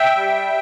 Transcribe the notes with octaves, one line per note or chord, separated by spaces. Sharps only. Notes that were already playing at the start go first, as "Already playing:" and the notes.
Already playing: E5 G5
G3